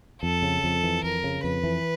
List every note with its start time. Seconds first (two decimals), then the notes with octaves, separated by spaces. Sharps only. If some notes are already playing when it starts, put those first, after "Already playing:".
0.22 F2 A4
0.42 C#3
0.64 F2
0.83 E3
1.03 F2 A#4
1.24 C#3
1.44 F2 B4
1.64 E3